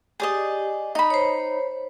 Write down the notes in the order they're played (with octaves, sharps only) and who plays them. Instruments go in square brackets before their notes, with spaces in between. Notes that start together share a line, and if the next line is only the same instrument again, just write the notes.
[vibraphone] G4 [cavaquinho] G#4 D5 D#5
[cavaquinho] D#4 B5 [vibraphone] D#6
[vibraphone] C5 C#5